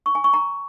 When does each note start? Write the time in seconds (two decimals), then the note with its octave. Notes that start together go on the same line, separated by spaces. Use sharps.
0.06 C#6
0.15 G#5
0.24 C#6
0.34 A#5